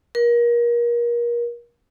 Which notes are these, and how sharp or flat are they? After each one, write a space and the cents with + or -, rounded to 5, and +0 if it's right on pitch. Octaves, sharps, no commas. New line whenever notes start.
A#4 +30